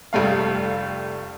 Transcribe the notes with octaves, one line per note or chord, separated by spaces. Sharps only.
F1 G3 A3 F5